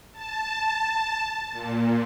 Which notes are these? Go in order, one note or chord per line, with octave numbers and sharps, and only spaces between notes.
A5
A#2